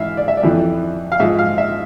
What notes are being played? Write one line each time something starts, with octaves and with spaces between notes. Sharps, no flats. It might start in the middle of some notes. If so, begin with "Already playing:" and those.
Already playing: G#2 E3 E5 F5
D5
E5
D5
F2 E3
F5
G#2 F3 E5
F5
E5